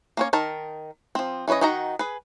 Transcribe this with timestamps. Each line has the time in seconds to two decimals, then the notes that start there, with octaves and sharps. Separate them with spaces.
0.17 A#3 C#4 C#5
0.33 D#3 A#4 A5
1.15 F3 C4
1.48 E3 C#4 B4 C#5 D#5
1.61 D#3 D#4 F#4 F#5 A#5
1.99 G#4 B4